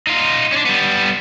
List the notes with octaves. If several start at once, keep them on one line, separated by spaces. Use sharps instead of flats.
D#4 F4
C#4 D4
G3 B3